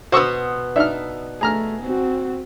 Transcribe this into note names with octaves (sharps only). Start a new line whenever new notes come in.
B2 B3 F#4 C5 C#6 E6
D4 D#4 E5 F6
A3 G#4 A#5 F6
C4 F#4